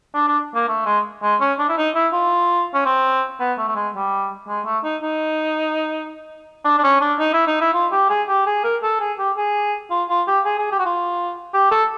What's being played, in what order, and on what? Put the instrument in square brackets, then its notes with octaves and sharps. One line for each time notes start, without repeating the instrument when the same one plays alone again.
[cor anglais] D4
D4
A#3
A3
G#3
G#3
C#4
D4
E4
D#4
E4
F4
C#4
C4
B3
A3
A3
G#3
G3
G#3
A3
D#4
D#4
D4
D4
C#4
D4
D#4
E4
D#4
E4
F4
G4
G#4
G4
G#4
A#4
A4
G#4
G4
G#4
F4
F4
G4
G#4
G#4
G4
F#4
F4
G4
A4